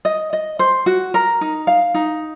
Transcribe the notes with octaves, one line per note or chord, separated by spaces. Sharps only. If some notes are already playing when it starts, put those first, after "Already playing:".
D#5
D#5
C5
F#4
A#4
D#4
F5
D#4